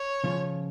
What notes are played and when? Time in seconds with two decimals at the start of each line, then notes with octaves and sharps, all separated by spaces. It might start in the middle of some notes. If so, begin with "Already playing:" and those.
Already playing: C#5
0.24 C#3 F3 C#4 F4